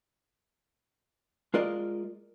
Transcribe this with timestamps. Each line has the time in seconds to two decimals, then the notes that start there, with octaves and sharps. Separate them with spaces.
1.54 G#3 F4 A#4 D5 D#5